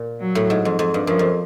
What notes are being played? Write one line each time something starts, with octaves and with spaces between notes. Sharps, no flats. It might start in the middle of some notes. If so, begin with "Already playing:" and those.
Already playing: A#2
F#3
A2
G#2
F2
F2
G2
F#2 F3
F2